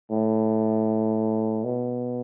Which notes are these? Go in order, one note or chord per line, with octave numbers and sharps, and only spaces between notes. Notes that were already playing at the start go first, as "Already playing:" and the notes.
A2
B2